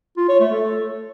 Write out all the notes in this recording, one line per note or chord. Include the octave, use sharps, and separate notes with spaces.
F4
C#5
A3
A4